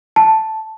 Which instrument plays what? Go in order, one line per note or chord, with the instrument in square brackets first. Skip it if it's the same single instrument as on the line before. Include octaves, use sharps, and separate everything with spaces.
[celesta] A5